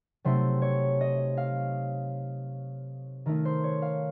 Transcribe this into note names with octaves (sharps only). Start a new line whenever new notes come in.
C3 F#3 A3 D#4 C5
C#5
D#5
F5
D#3 A3 D#4 A#4
C5
C#5
F5